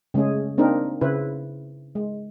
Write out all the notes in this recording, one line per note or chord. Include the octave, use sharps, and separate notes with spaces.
C#3 G#3 A3 C#4 G#4
A#3 C4 D4 D#4 A#4
C#3 E4 B4 C5
G#3